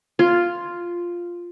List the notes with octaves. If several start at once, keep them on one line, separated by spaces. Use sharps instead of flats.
F4